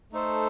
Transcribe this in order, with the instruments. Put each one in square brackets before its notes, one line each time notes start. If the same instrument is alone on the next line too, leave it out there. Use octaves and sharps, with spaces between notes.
[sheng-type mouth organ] A3 D#4 A4 C5